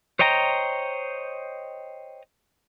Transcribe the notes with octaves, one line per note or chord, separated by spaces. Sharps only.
C5 C#5 D#5 G5 A#5